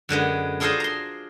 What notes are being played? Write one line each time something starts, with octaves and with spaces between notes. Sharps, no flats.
F#2 D3 G#3 B3
D4 F4 G#4 A4 C5 D#5
A#5 C6